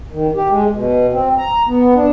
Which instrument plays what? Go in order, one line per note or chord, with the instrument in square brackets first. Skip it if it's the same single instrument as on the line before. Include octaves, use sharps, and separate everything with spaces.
[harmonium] D#3
G4
G#3
B2
C4
A#5
B3
D4